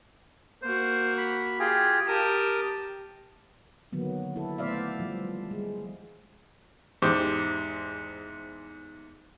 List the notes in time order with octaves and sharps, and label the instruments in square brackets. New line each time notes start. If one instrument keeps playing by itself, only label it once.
[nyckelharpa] A#3 F#4 [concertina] C5
[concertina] B5
F4 G4 G#4
[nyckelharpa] G4 A5 [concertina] A#4 D#6
[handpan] D3 D#3 F#3 A#3 B3
E4 A4
A3 B3 C5 D5 E5 F5
F3 G3
G#3
[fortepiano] E2 G#2 G4 C5 D6